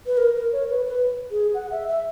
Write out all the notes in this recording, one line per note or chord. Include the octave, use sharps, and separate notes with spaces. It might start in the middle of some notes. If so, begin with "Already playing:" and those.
B4
A#4
A#4
C#5
B4
B4
G#4
F#5
E5
E5